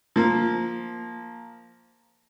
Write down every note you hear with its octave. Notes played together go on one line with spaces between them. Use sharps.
F3 A#3